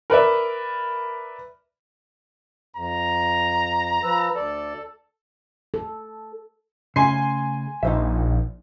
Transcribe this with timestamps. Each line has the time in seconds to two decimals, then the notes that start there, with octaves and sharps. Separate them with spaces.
0.10 A#4 B4 D5 E5
2.76 F2 A#5
4.04 F3 B4 E6
4.36 D2 A4 D5
5.74 A4
6.96 C#3 A3 G#5 C6 C7
7.83 A#1 D#4 C5 E5